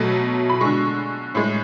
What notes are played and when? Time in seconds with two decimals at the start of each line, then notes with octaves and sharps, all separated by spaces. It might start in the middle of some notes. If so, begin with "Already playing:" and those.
Already playing: B2 F#3 A3
0.50 B5
0.61 D3 G#3 C#6
1.35 A2 G#3